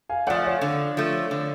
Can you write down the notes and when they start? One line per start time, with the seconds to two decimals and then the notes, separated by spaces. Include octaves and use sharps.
0.10 F5 G#5
0.27 F3 A3 D5 F#5
0.45 C#5 F5
0.61 D3
0.97 F3 A3
1.31 D3